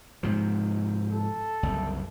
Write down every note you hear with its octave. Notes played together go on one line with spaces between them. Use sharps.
G#2 C3 F3
A4
F#1 C2